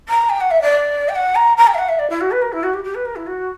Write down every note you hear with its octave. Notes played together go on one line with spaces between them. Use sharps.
A#5
G5
F#5
E5
D5
G5
F#5
A#5
A#5
G5
E5
F#5
E5
D5
E4
F#4
B4
A#4
E4
F#4
G4
G4
B4
A#4
E4
F#4